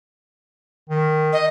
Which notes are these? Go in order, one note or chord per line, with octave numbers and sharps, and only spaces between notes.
D#3
D#5